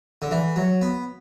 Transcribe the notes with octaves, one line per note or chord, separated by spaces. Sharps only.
D3
E3
F#3
B3